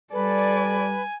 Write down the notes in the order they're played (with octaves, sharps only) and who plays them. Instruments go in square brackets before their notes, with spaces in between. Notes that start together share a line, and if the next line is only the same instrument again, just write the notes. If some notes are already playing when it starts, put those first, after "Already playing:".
[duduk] G3 [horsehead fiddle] A4 D5 [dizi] B4 [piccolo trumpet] G#5